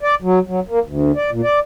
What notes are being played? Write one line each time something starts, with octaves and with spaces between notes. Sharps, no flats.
D5
F#3
F#3
A#3
D2
D5
A#2
D5